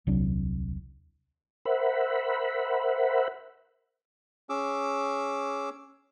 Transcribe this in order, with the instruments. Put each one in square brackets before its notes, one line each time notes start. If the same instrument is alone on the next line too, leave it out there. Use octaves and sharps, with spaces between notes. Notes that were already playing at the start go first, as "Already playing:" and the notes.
[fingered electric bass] D#1 C2 F#3 D4
[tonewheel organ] A#4 C5 E5 F#5 B5
[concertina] C#4 G#4 D6 E6